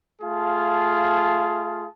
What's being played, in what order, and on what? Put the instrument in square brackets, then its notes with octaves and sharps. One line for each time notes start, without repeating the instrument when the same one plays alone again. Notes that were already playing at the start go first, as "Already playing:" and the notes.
[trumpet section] A3 F4 G#4 F5 A5